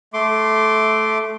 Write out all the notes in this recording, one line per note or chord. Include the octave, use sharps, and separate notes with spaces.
A3 C6 D6